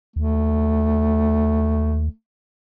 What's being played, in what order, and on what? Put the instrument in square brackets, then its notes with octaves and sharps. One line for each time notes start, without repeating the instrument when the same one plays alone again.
[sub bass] D#2 [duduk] A3